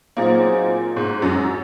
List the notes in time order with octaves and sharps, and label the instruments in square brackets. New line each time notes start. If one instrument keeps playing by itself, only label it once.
[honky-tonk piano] A#2 A#3 [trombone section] F#3 C4 D#4 G#4 C5
[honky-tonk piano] G#2 G#3
F#2 F#3